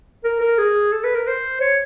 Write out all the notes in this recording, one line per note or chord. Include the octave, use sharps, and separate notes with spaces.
A#4
A#4
G#4
A4
B4
A#4
C5
C#5